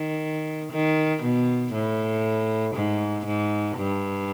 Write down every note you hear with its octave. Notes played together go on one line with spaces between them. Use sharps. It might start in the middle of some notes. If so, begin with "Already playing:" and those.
Already playing: D#3
D#3
B2
A2
G#2
G#2
G2